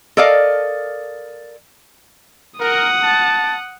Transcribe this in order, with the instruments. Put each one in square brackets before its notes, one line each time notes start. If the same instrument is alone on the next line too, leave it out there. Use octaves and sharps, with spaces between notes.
[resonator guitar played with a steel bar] A4 A#4 D5 D#5 F5
[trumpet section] A#4 [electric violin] F#5 D#6
[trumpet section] A5